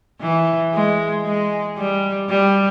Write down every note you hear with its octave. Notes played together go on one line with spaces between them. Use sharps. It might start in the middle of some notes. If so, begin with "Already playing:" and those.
E3
G#3
G#3
G3
G3